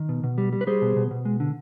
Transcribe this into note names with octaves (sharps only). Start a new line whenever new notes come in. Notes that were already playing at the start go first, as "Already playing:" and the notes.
Already playing: D#3
B2
B2
G3
G3
B4
G3 G#4 C5
B2
B2
B2
G#3
D3